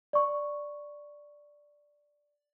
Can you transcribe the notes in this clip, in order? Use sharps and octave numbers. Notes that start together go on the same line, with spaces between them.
D5 C#6